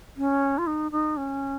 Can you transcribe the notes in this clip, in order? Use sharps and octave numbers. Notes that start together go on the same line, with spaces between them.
C#4
F4
D#4
D#4
C#4